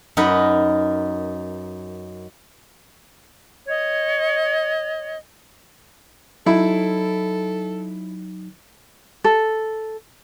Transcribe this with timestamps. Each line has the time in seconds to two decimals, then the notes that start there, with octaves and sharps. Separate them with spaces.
0.17 F#2 D#4 A#4 B4 F#5
3.67 C#5 D#5
6.46 F#3 D#4 E4 A4
9.24 A4